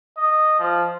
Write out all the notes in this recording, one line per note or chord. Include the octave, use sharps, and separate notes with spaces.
D#5
F3